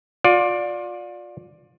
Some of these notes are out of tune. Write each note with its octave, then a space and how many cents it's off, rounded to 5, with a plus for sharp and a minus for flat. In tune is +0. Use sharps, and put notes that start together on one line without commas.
F4 +30 D5 +0